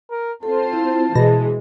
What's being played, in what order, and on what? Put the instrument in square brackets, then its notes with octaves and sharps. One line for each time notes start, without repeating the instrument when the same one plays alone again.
[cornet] A#4
[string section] C4 F4 C5 [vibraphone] A4 [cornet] A5
[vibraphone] E4
[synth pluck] B2 A#6 [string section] E3 G#3 [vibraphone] G#4